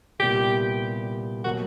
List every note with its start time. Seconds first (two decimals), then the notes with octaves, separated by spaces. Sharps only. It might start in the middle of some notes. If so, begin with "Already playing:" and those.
0.19 C2 A#2 G3 B3 G4
1.44 B2 F#3 A#3 F#4